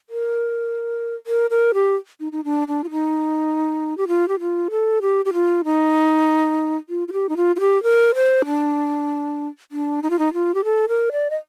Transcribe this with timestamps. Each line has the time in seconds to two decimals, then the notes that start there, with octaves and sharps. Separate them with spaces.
0.10 A#4
1.27 A#4
1.50 A#4
1.74 G4
2.20 D#4
2.32 D#4
2.44 D4
2.68 D4
2.84 F4
2.91 D#4
3.97 G4
4.08 F4
4.28 G4
4.40 F4
4.71 A4
5.02 G4
5.25 G4
5.33 F4
5.65 D#4
6.89 F4
7.08 F4
7.13 G4
7.29 D#4
7.37 F4
7.56 F4
7.60 G4
7.83 A#4
8.15 C5
8.46 D4
9.72 D4
10.03 D#4
10.10 F4
10.19 D#4
10.34 F4
10.54 G4
10.64 A4
10.89 A#4
11.12 D5
11.30 D#5